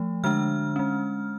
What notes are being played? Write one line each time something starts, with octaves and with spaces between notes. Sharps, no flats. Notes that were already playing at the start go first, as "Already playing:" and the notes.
Already playing: F3 A3
D3 G#3 D4 F6
G#3 C#4